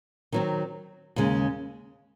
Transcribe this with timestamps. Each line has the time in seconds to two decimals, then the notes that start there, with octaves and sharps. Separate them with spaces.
0.32 D#3 F#3 C4
1.16 D#2 C#3 G#3